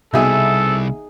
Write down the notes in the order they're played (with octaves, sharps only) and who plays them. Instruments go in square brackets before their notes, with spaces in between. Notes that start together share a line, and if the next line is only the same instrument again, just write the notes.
[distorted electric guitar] C2 [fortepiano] B2 E5 [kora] D#4 G#4 [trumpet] A4